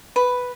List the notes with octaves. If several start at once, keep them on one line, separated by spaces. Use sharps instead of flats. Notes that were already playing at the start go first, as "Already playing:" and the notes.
B4